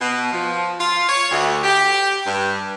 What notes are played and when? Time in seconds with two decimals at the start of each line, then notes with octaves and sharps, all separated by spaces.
0.01 B2
0.32 F3
0.80 F4
1.09 C#5
1.31 D2
1.64 G4
2.26 G2